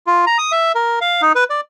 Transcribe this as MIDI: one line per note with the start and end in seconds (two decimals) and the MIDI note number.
0.07 0.25 65
0.27 0.38 82
0.38 0.52 87
0.52 0.72 76
0.75 0.99 70
1.01 1.21 77
1.22 1.33 63
1.35 1.44 71
1.50 1.61 74